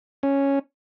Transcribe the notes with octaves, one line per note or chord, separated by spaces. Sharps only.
C#4